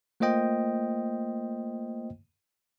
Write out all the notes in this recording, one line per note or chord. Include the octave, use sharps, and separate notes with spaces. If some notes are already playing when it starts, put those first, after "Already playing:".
A3 A#3 F4 C5 D#5 G5